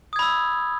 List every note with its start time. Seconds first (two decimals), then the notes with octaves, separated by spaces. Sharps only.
0.13 D#6
0.16 G#6
0.19 B5
0.22 E6